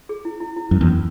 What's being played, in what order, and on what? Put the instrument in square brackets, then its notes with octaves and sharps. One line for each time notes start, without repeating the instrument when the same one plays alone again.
[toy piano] G#4
E4
E4
E4
[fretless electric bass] F#2 [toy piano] E4
[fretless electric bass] E2
[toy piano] C#4